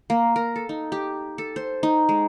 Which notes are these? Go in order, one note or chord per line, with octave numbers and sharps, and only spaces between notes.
A#3
A#4
A4
D#4
G4
A4
C5
D#4
G#3